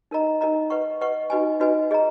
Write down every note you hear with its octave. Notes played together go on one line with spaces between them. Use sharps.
D#4 A#4 D#5 A#5
D#4 A#4 D#5 A#5
B4 D#5 F#5 C#6
B4 D#5 F#5 C#6
D#4 F#4 B4 D#5 G#5
D#4 F#4 B4 D#5 G#5
G#4 D#5 A#5